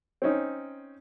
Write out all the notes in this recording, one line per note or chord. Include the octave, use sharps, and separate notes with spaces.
C4 C#4 D#4